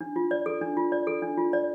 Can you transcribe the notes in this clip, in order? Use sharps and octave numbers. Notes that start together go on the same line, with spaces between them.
D4
F4
D5
A4
D4
F4
D5
A4
D4
F4
D5